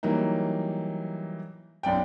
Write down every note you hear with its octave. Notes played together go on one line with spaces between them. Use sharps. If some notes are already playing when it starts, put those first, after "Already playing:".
E3 F#3 G3 A#3 D#4
B1 F#2 D5 G5